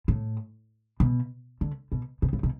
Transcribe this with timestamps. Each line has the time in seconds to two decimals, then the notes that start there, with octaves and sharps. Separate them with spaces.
0.08 A2
1.00 B2
1.61 D3
1.92 B2
2.22 B2
2.33 A2
2.43 B2